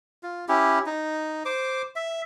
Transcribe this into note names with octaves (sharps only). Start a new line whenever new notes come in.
F4
C#4 E4 G4
D#4
C5 D6
E5